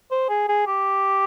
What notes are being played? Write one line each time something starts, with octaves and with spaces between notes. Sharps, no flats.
C5
G#4
G#4
G4